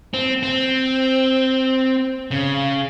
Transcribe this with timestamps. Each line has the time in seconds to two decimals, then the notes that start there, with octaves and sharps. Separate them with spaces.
0.14 C4
0.43 C4
2.31 C#3